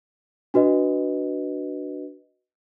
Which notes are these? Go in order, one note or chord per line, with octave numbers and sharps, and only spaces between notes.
D4 F#4 B4 D#5